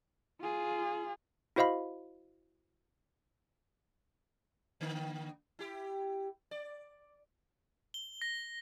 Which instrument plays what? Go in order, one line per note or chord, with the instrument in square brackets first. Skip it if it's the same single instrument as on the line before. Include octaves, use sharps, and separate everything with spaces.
[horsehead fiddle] F4 G#4
[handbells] E4 F#4 C5 D#5 F5 B5
[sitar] D3 A#3
E4 G4
D5
[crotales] G7
A#6